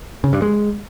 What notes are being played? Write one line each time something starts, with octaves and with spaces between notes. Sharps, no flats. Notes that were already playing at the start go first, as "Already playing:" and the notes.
C#3
G2
G#3